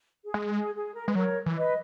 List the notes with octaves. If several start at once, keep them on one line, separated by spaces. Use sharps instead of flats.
G#4
G#3
G#4
G#4
A#4
G#3 B4
F#3 A#4 C#5
E3
B4 D#5